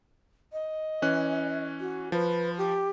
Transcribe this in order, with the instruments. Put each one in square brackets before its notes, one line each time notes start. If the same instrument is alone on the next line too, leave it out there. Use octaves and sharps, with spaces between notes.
[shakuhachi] D#5
[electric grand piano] E3 C#4 F#6
[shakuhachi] F#4
[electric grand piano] F3 [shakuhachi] B4
[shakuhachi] G4